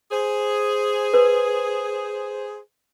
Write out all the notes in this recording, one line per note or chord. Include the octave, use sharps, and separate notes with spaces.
G#4 C5
B4